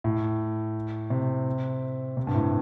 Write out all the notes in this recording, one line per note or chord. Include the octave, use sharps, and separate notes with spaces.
A2
C3
C3
G2
A2